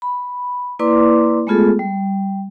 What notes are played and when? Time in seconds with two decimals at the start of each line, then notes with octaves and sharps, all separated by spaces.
0.02 B5
0.79 A#3 E4 B4 D5 C6 D6
1.47 G#3 A3 B3 F4 G#4 A4
1.79 G3